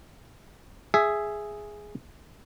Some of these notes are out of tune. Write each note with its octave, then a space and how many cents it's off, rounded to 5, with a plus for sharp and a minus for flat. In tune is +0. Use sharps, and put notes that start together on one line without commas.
G#4 +0 E5 +5